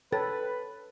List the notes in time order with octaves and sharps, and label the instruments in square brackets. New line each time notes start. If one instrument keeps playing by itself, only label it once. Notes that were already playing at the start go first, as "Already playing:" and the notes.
[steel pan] A4 [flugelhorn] B4 [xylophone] C#5 G5 A6